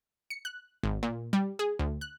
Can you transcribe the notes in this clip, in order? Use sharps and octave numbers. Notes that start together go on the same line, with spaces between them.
C#7
F#6
G#1
A#2
G3
G#4
D2
F#6